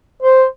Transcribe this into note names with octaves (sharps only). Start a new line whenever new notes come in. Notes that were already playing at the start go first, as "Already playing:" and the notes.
C5